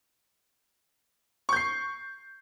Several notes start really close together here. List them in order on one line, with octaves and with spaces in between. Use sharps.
C#6 G6 C7